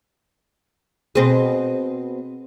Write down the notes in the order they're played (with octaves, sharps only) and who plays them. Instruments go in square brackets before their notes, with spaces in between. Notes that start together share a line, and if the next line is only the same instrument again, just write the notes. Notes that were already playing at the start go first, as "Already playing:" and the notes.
[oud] B2 C4 G#4